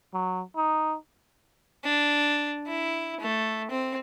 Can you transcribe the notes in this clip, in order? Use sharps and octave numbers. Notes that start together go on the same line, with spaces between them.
F#3
D#4
D4
E4
A3
C4